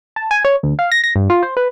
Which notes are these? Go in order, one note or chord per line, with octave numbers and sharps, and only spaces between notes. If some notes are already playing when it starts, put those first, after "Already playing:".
A5
G#5
C#5
D2
F5
A#6
A#6
G2
F4
C5
B4